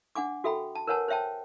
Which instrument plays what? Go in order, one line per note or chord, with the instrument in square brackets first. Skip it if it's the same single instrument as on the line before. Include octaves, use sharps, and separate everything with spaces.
[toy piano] D4 F#5 G#5 D6
F#4 A4 E5 G5 B5
A5
A#4 B4 C#5 F#5 G#5 A5
C5 C#5 E5 G5 A5